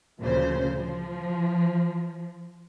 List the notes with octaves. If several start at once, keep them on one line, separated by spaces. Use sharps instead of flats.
D2 A#2 C#3 F3 C5
F3